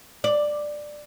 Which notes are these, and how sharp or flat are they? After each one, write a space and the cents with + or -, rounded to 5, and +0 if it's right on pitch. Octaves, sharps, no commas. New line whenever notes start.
D5 +10